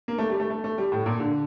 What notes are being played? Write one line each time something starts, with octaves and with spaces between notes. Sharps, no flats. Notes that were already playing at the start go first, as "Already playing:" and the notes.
A#3
A3
G3
A3
A3
A3
G3
A2
A#2
D3